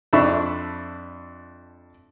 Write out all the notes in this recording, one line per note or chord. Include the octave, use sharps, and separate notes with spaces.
F2 D4 E5 B5 C#6 E6